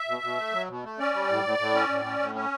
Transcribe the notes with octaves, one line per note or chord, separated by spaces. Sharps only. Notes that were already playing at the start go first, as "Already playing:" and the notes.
Already playing: E5
B2
B2
A3
F#3
B2
A3
C#4 D5
G3
A2
A2
A2
C#4
A2
C#4
A2
C#4